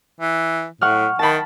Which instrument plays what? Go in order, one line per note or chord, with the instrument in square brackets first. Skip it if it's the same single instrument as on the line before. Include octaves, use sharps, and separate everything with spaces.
[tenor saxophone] E3
[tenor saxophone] A2 [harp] F#5 C#6 F6
[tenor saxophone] D#3 [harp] A5 B5